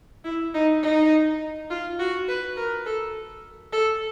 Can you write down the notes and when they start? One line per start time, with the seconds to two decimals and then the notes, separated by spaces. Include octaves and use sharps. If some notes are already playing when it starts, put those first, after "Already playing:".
0.24 E4
0.54 D#4
0.83 D#4
1.70 F4
1.99 F#4
2.28 B4
2.57 A#4
2.86 A4
3.73 A4